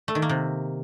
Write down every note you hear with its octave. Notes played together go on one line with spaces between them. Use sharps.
A3
D#3
A#3
C3